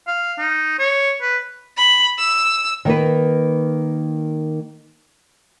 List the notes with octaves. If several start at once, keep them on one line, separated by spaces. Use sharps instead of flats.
F5
D#4
C#5
B4
B5
E6
D#3 A#3 B4